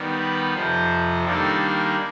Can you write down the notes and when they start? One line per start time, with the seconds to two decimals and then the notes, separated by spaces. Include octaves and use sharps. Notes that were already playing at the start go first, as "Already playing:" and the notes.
Already playing: D#3 G3 B3
0.19 B4
0.54 F2 C3 F3 C5
1.24 D#3 G3 A#3 D4 A4